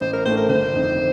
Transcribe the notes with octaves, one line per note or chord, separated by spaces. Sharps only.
A1 C5
A#4
A2 A3 D4 C5
A#4
G1 C5
F2 D#3